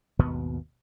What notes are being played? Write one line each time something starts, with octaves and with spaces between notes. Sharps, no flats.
G#1 D#2 B2 B3